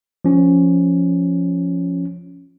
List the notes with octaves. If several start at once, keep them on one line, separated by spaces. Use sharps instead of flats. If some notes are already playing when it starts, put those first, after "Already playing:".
F3 C#4